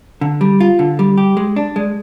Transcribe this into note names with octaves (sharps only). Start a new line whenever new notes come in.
D3
G3
F4
D3
G3
G4
G#3
D4
G#3